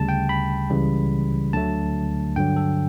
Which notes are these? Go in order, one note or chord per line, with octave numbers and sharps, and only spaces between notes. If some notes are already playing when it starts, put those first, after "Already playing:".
Already playing: D2 C#3 G3 A5
G5
B5
C#2 C#3 E3 G3
D2 D3 F#3 A3 A5
G2 D3 F#3 G5
A4